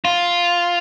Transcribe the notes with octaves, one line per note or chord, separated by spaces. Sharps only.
F4